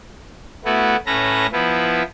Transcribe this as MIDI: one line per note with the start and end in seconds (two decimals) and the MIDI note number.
0.65 0.96 57
0.65 0.96 59
0.65 0.96 64
0.65 0.96 66
1.06 1.46 45
1.06 1.46 61
1.06 1.46 69
1.06 1.46 71
1.06 1.46 82
1.06 1.46 94
1.52 2.03 53
1.52 2.03 59
1.52 2.03 64